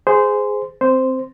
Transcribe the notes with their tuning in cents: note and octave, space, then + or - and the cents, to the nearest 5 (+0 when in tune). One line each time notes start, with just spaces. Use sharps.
G#4 +0 C5 -20
C4 +0 C5 -10